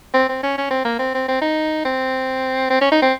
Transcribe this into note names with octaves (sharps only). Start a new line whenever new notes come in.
C4
C4
C#4
C#4
C4
A#3
C4
C4
C4
D#4
C4
C4
C#4
D#4
C4